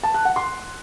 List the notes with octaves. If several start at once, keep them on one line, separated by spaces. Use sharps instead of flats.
A5
F#6
F#5
C6